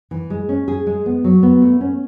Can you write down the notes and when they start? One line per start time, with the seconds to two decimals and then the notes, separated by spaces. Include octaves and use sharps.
0.11 E3
0.30 G#3
0.49 C#4
0.68 G#4
0.87 G#3
1.06 B3
1.24 F#3
1.43 B3
1.62 A3
1.81 C#4